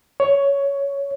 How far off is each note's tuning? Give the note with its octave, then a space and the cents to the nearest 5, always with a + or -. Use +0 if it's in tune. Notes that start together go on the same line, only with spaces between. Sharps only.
C#5 +10